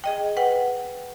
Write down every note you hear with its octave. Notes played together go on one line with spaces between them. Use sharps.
G#4 D#5 G5
B4 F#5 G5